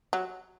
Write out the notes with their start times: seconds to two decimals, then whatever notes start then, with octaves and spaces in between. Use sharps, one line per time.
0.13 F#3